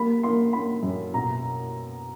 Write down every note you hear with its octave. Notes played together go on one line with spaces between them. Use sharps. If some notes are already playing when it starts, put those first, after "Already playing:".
Already playing: A#3 B5
A#3 C6
A#3 B5
F#2
B2 A#5